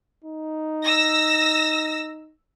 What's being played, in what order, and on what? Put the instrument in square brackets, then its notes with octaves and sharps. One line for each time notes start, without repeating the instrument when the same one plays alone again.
[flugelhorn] D#4
[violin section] E6 A#6